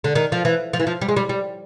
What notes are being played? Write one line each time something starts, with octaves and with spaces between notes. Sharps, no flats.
D3
D#3
F3
E3
F3
E3
F3
G3
G#3
G3
G3